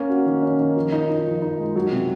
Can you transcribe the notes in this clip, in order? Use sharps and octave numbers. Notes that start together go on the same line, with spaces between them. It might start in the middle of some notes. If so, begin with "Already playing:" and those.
Already playing: A#3 C#4
F#4
D#3
C#4
D#3
F3
D#4
D#4
F3
D#4
G#3
F#3
C3